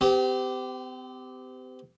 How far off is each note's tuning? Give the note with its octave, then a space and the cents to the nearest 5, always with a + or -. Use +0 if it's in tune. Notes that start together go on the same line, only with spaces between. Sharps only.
C4 -40 G4 +0